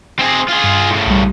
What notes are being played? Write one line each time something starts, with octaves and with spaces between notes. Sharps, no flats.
C4 G#4
F4 G#4
G2
A2 C#3
B1 G3